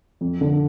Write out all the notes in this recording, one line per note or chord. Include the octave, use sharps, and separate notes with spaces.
F2
D3